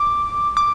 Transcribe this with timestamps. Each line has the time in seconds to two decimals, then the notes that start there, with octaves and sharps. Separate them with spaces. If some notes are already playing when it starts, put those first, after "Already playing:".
Already playing: D6
0.57 D6